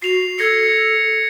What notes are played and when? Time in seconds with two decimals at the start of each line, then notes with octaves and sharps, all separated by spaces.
0.02 F#4 C7 F7
0.39 A4 G#6 A#6 C#7